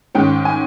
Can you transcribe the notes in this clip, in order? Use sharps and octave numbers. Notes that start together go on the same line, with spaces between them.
G#2 D#3 G#3 C#4 G5
G#5